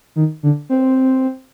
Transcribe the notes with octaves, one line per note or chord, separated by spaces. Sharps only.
D#3
D3
C4